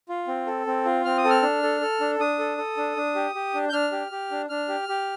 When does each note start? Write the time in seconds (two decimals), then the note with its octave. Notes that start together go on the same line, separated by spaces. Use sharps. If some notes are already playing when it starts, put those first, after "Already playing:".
0.09 F4
0.28 C4
0.47 A4
0.67 C4
0.85 F4
1.05 C4 F6
1.17 D#6
1.24 A4
1.30 F6
1.43 D4
1.63 A4
1.81 A4
2.01 D4
2.19 D4 D#6
2.39 A4
2.58 A4
2.77 D4
2.97 D4
3.15 G4
3.35 G4
3.54 D4
3.69 G6
3.73 D4 F6
3.92 G4
4.11 G4
4.31 D4
4.49 D4 F6
4.69 G4
4.89 G4